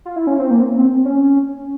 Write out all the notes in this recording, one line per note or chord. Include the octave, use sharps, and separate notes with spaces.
F4
E4
C#4
C4
A#3
C4
C#4